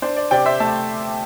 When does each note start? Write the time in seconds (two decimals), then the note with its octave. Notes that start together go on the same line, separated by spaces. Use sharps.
0.02 D4 C5
0.16 D5
0.31 C3 D5 G5
0.46 C5 E5
0.60 A3 E5 A5